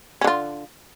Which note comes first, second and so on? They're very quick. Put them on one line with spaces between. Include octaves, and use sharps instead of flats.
C#4 D3 F4